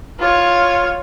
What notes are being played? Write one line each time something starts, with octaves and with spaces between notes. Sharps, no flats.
F4 C#5